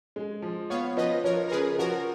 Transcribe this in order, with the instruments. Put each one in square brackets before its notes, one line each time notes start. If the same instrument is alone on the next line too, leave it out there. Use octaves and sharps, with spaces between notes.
[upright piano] G#3
F3
[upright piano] B3 [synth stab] C#5 F5
[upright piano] F3 [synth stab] B4 D#5
[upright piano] F3 [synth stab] A#4 C#5
[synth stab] A#4
[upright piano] C#3 [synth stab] G#4 B4
[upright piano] F3 [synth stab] F#4 A#4